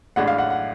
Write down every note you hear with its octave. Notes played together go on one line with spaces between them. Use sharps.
A1 A2 G#3 D4 F#5
F5
F#5
F#5